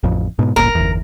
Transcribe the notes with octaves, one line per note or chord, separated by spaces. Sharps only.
A1 F2
G#2 B2
D1 G1 A#2 A#4
G1 E2